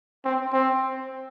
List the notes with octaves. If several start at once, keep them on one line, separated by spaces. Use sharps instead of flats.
C4
C4